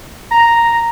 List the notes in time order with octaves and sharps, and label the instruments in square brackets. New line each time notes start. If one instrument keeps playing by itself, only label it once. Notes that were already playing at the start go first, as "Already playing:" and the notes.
[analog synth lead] A#5